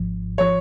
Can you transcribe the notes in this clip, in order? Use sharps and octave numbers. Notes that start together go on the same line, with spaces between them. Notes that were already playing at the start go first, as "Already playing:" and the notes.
Already playing: G#1 G#2 F3
F3 C#5